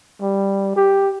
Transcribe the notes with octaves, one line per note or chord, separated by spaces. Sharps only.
G3
G4